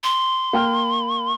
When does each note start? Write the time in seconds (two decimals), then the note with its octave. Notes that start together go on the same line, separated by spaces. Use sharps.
0.04 C6
0.53 A#3 G5 F6